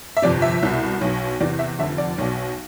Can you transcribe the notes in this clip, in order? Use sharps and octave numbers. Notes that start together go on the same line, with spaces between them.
E5
G1 F2 C3 D5
E5
C2 B2
B1 B2
E2 C3 E3 D5
E5
F1 F2 D3 E5
D5
B1 B2